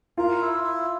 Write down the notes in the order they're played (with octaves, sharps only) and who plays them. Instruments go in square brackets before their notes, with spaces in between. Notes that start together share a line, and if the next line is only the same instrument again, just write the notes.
[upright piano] F4 [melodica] A#4
[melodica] E4
E4